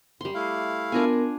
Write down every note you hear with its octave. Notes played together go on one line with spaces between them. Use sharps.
F#2 G3 C6
A3 E4 F5
B3 D4 F4 A#4 G#5